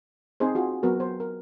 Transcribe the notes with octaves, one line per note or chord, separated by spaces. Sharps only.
C4 D#4 G#4 C5
F4 F#4 G#4
F#3 B3 F#4 A#4
C5
A#4